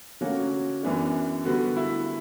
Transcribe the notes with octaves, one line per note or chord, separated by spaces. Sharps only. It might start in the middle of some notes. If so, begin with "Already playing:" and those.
D3 F#3 A#3 C#4 F#4
F#2 E3 B3 D4
D3 G3 B3 F#4
E4